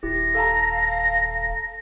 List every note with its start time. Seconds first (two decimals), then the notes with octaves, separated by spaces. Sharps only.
0.03 D#1 E4 G4 A#6
0.35 A4 F5 A5 A#5